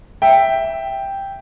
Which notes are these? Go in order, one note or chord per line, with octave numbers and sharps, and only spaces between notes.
E5 G5